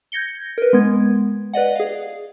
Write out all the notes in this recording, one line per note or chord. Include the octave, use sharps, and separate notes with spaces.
G6 G#6 A#6 C#7 G7
A#4 B4
G#3 B3 G#6
B4 D5 D#5 F#5
G#4 F5